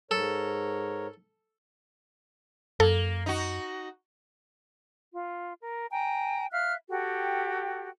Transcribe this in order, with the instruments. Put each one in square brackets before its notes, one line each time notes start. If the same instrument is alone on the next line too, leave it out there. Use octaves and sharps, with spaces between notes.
[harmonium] G#2 A#4 C#5 [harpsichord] A4
[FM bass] F#2 [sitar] A#3 [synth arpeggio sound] A4
[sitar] D#4 F#4
[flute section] F4
A#4
G5 G#5 A#5
E5 F5 F6 F#6
F#4 G4 A4 G5